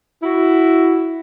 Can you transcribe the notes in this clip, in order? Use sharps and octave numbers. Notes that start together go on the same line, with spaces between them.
E4 F#4